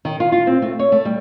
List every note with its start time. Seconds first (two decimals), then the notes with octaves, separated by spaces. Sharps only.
0.05 D#3
0.20 F4
0.32 F4
0.47 C4
0.62 A3
0.79 C#5
0.92 A3
1.05 G3